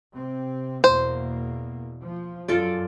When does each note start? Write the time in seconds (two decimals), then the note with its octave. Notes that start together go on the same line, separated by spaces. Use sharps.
0.15 C3 C4
0.84 E2 B2 A#3 C5
2.02 F3
2.48 F#2 F4 A4 D5